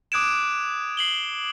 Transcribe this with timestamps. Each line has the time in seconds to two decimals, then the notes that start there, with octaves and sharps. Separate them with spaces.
0.12 D6 D#6 F#6 G#6 D7 E7
0.97 C7 F#7 G7